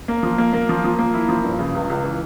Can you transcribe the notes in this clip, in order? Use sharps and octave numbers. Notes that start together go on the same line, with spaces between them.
A#3
F3
A#3
A#3
F3
F3
A#3
E4
F3
G2
C#3
C#2
C#2
E3